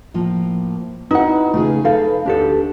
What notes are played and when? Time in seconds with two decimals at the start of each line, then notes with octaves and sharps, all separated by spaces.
0.14 A2 F3 A#3
1.11 D#4 E4 F#4 B4 F#5
1.54 C#3 A3 F4 G#4
1.85 A4 B4 F5
2.26 D2 D4 G4 A4